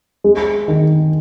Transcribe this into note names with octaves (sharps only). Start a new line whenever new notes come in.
G#3
D#3